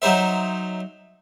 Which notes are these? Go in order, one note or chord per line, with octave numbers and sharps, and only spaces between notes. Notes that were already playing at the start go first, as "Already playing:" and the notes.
F#3 D#4 C5 E5